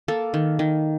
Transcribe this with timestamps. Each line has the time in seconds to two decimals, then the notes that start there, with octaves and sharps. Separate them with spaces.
0.08 A#3 A4
0.34 D#3
0.59 D#3